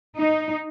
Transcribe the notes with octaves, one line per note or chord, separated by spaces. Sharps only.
D#4